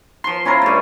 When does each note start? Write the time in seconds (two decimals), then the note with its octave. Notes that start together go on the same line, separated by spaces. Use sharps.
0.24 F3 C6
0.45 C#4 E4 F4 A#4
0.62 G2 A3